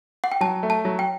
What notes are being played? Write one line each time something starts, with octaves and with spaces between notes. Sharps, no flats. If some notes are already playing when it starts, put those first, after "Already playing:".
F#5
G5
F#3 A5
A3
A5
F#3
G5